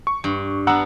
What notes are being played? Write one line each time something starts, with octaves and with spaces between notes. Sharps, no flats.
C#6
G2
B3 D4 F#5 A#5 E6